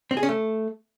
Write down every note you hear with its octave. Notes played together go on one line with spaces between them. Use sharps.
C4
G#4
C#4
A3